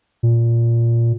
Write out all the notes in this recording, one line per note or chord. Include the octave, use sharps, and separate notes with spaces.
A#2